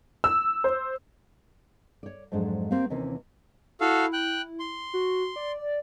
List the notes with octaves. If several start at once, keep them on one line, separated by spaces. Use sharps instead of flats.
E6
C5
C#5 D5
F2 G#2 F#3 G#3 D4
A#3 C4 G4 C5 F5
D#2 C3 E3 A#3 C4 C#4
E4 F#4 A4 F5
G5 F#6
C6
F#4
D5